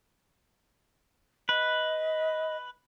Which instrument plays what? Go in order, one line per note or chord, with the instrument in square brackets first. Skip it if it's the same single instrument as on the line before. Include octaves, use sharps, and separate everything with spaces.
[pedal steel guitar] B4 [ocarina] D#5